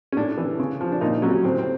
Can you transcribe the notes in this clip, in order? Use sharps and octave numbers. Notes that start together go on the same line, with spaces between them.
C#4
A2 D4
E3
C#3
F3
D4
A#2 D#4
F#3 C#4
A2 C4
C4